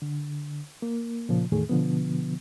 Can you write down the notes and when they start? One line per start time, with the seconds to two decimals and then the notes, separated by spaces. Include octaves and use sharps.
0.02 D3
0.82 A#3
1.29 A#2 C#3 F3
1.52 E2 A2 D#3 A3 G#4
1.69 B2 D3 F3 B3